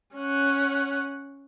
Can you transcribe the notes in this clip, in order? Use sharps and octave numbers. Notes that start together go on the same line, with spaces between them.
C#4 F#5